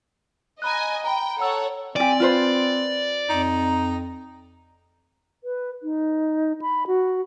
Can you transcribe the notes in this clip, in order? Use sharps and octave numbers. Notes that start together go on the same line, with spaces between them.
D#5 G#5 A#5 B5 F#6
G5 A#5 B5
A4 C#5 F#5 A#5 E6
C4 G4 D5 G#5
F4 B4 C5
F2 D#4
B4
D#4
B5
F#4